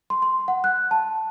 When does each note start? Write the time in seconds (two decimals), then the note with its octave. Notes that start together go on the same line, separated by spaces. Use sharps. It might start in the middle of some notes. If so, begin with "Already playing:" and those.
0.10 C6
0.22 C6
0.48 F#5
0.64 F#6
0.91 A5